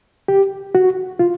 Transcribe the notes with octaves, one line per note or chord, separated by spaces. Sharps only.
G4
F#4
F4